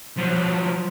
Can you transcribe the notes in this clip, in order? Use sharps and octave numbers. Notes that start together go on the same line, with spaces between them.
F3 F#3